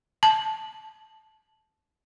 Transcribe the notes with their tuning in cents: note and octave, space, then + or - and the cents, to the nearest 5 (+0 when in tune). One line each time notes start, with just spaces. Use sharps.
A5 -15